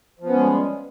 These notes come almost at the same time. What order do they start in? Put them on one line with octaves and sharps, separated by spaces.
F3 B3 C#4 G#3 G3